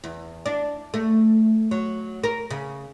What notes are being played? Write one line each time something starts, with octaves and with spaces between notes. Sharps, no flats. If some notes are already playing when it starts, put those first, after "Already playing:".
E2
D4
A3
F#3
A#4
C#3